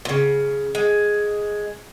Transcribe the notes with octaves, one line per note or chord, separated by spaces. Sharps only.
A#2 C#3
G#3